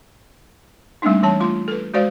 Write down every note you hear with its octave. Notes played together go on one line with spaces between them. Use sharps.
G3 A3 A#3 C4 D4 D#4
E3 G3 C#5 A5
A3 F4 C6
A4 B4
G#3 F#4 C5 D5 F5